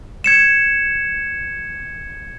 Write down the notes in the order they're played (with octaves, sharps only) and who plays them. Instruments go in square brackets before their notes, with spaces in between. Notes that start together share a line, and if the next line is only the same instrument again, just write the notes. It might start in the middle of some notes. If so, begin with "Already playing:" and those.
[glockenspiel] G#6 C#7 E7